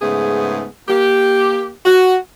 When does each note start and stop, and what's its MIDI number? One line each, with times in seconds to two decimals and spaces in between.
0.01 0.65 44
0.01 0.65 49
0.01 0.65 57
0.01 0.65 59
0.01 0.65 68
0.88 1.71 58
0.88 1.71 67
1.85 2.16 66